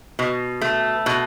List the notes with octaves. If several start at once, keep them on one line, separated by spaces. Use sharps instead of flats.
B2
A3
B2